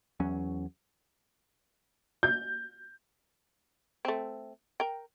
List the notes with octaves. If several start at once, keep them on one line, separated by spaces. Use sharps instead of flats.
E2 F#3 C#4
G6
A3 C4
A#4 G5